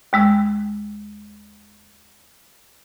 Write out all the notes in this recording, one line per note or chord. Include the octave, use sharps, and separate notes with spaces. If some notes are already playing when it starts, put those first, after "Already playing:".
D#2 G#3 E6